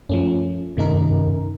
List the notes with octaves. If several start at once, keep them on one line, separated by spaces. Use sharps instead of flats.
F#2 F3 A3 C#4
F#2 C3 D#3 A3 D#4 A#4
F#2
F#2
F#2